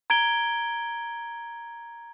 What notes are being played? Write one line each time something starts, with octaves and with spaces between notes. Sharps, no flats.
A#5 G#6 D7 G7